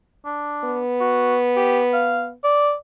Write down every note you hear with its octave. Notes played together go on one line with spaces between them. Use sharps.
D4
B3
F#4
G4
F5
D5